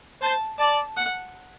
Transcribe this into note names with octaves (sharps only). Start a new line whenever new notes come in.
C5 A5
D5 A5
F#5